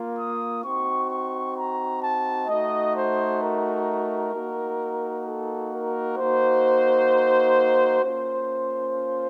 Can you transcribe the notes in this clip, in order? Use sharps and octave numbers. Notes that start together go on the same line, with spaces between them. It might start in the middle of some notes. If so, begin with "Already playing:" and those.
Already playing: A#3 F4
D#6
C4 D#4 F#4 C#6
C#6
A#5
A5
A3 D#4 F#4 D#5
C5
A#4
A#3 D#4 F#4
A4
A#4
A#3 D#4 F#4 C5
A#3 C#4 F4 C5